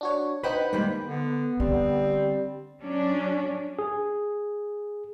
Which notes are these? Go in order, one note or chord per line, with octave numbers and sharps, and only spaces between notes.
D4 F#4 C#5
D#4 B4 C5 F#5 G5 B5
D#3 G3 G#3 A#3 G5 B5
D3 B3
D3 G3 C4
F#3 C#4 D4
G#4